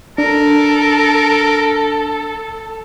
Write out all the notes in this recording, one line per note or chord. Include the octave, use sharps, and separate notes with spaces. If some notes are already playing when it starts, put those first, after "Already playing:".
D4 A4 A#4